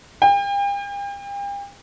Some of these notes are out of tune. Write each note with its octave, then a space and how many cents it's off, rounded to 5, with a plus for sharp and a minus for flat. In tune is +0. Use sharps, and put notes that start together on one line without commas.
G5 +40